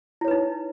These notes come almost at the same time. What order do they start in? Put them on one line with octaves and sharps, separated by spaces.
E4 C#5 B4 D#4